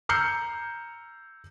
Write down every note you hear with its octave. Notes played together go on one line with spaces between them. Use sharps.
A#5 E6 F6 G6 C7 C#7